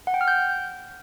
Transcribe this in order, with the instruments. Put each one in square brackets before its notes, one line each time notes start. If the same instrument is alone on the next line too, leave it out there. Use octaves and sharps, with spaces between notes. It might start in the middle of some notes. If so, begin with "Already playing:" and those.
[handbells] F#5
G5
F6
G6